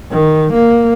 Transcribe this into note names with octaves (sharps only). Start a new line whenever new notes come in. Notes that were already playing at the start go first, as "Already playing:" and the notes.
D#3
A#3